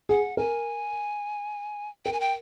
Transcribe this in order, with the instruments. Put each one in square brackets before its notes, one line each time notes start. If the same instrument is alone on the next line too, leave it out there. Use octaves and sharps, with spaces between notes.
[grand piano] G#4 [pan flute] F#5
[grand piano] A#4 [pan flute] G#5
[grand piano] A#4 [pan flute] G5
[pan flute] G#5
G5